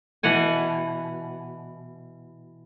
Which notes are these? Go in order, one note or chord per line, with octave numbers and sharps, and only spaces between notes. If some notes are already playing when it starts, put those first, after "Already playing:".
B2 E3 F#5 G#5